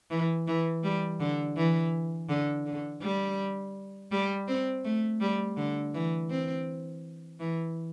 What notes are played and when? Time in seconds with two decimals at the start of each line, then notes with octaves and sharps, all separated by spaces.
0.11 E3
0.47 E3
0.84 G3
1.20 D3
1.56 E3
2.29 D3
2.66 D3
3.02 G3
4.12 G3
4.48 C4
4.84 A3
5.21 G3
5.57 D3
5.94 E3
6.30 C4
7.40 E3